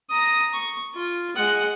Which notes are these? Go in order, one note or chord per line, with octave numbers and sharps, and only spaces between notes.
A#5 D#6
C#6
F4
G#3 F#5